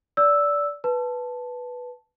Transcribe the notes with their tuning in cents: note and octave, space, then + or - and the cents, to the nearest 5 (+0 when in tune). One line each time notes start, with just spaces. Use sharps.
D5 -20 E6 +0
B4 +0 A5 -5